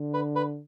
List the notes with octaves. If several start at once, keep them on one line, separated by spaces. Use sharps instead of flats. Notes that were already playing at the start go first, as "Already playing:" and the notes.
Already playing: D3
B4
B4